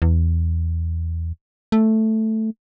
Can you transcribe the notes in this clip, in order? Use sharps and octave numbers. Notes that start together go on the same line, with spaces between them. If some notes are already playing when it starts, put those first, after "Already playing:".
E2
A3